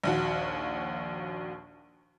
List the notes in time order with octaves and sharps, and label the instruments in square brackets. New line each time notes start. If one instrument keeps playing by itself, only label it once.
[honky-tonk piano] A#1 D#2 F#4